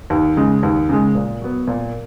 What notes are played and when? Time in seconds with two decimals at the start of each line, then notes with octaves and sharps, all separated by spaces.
0.10 D#2
0.37 C#3 G#3
0.63 D#2
0.89 C#3 G#3
1.15 A#2
1.41 F#3 B3
1.67 A#2